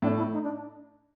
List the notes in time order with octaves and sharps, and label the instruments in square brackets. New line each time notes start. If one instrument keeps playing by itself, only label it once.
[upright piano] A2 [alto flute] D4
[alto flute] E4
D#4
D4